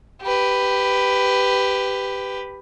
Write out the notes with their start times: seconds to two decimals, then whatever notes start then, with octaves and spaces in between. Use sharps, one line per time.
0.22 G4 B4